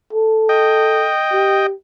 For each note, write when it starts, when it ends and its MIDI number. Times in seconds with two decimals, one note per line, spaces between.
0.13 1.12 69
0.49 1.67 75
0.49 1.67 79
1.32 1.72 67